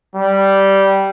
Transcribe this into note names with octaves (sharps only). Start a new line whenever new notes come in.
G3